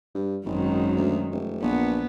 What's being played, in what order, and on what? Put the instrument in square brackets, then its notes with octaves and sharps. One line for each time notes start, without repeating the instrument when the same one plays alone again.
[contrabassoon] G2
[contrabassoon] G#1 [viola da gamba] F#2 D#3 G#3
[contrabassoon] D2
F1
[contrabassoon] A#1 [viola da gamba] B3